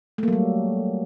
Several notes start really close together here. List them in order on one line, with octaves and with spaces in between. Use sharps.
A3 A#3 F#3 G3